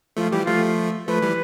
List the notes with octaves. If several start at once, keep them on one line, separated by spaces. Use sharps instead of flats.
F3 A3 F4
E3 G3 G4
F3 A3 F4
F3 A3 B4
E3 G3